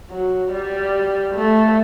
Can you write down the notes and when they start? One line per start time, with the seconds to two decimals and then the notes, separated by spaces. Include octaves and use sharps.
0.10 F#3
0.52 G3
1.35 A3